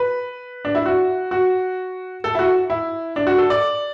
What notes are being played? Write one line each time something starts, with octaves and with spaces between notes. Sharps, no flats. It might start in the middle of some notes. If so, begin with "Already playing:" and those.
Already playing: B4
D4
E4
F#4
F#4
A4
E4
F#4
E4
D4
F#4
A4
D5